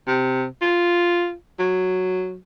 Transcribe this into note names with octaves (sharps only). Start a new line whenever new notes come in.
C3
F4
F#3